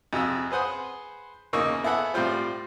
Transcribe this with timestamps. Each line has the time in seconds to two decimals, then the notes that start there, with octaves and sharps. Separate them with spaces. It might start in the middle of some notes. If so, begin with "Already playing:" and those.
0.13 F2 C3 G#4 E6
0.51 G#4 B4 C5 F#5 D#6
1.53 E2 C#3 A#3 D#4 C#6 E6
1.83 B3 E4 G#4 A4 F#5
2.14 A2 G3 C4 F4 C5